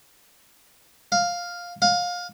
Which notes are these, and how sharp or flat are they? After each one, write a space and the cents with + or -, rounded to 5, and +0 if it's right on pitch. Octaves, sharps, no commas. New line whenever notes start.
F5 +5
F5 +25